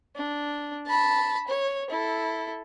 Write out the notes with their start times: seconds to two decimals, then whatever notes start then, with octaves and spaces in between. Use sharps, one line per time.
0.16 D4
0.86 A5 B5
1.48 C#5
1.90 E4 A4